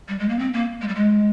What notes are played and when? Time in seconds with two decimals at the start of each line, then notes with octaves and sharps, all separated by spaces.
0.09 G3
0.19 G#3
0.29 A#3
0.39 C4
0.53 A#3
0.82 G#3
0.88 G3
0.95 G#3